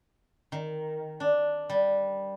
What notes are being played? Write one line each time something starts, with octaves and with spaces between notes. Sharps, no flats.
D#3
D4
G3